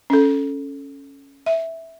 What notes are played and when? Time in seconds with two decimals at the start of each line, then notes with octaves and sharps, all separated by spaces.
0.10 C#4 A4
1.46 E5